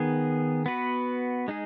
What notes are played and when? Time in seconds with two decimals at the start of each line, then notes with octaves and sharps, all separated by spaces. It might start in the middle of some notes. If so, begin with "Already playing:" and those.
Already playing: D#3 B3 G#4
0.66 B3 F#4 B4
1.48 G#3 D#4 G#4